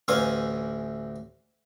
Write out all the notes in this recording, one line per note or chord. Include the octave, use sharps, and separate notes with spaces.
A1 D2 E3 F5 G#5 D#6